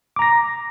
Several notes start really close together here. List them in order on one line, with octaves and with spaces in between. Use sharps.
D6 A#5 A#6